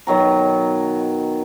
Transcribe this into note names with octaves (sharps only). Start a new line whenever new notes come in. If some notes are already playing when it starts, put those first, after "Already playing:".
B2 D#3 F#3 A#5